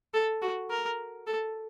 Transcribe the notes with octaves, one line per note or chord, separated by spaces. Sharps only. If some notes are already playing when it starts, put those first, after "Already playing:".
A4
F#4
A#4
A4